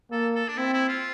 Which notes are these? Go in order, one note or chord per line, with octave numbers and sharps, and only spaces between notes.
A#3 A4
A4
D4
C4 E4
E4
F4